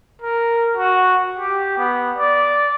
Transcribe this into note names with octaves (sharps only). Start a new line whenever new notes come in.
A#4
F#4
G4
B3
D5